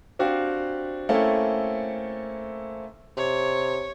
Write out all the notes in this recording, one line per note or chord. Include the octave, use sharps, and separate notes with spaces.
C4 D4 F#4 G4 F5
A3 A#3 C4 C#4 E4 A4
C3 C#5